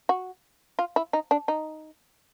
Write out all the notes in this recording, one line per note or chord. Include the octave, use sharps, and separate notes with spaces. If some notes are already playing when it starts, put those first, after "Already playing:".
F#4
F4
E4
D#4
D4
D#4